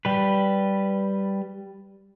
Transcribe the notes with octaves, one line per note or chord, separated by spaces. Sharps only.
G3 B4